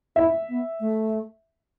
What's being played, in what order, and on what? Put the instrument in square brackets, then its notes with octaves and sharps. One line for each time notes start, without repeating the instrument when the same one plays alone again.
[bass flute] E4 [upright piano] E5
[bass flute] B3
A3